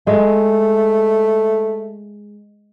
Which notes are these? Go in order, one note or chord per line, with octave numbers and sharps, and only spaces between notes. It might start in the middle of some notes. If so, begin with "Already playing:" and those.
G#3 A3